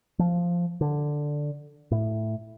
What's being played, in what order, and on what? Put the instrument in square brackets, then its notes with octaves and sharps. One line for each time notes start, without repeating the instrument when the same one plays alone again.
[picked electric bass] F3
D3
A2